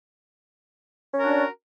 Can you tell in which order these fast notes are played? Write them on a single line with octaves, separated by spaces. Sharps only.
C#4 A#4 F#4 D4 D5